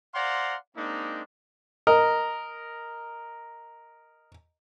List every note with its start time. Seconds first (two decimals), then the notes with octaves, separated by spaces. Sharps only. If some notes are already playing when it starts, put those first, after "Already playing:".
0.14 C5 D5 F5 F#5 A#5 C6
0.76 G#3 A#3 C4 D4 D#4
1.87 A#4 D#5